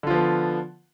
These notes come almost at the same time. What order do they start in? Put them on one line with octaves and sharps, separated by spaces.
D3 F4 F3 B3